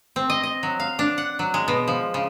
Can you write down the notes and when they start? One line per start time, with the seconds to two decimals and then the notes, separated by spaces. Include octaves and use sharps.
0.16 C4
0.30 D#5
0.43 D#5
0.63 F#3
0.80 F5
0.99 D4
1.18 F#5
1.39 F#3
1.54 G#3
1.68 B2
1.88 F3
2.14 C#3